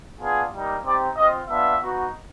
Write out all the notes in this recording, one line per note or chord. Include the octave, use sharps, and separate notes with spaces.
B3 D4 F4 G#4
G3 A#3 D#4
C4 D#4 G4 D5
C4 F4 D#5
B3 D4 F4 E5
B3 D#4 F#4